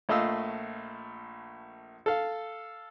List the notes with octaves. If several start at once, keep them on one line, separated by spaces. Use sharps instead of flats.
A#1 A3 D#5 F5 E6
A4 F5